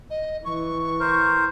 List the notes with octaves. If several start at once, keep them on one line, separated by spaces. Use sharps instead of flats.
D#5
E3 C#6
A#4 C5